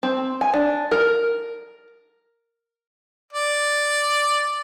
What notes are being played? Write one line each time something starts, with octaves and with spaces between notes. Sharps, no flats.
C4
G#5
D4
A#4
D5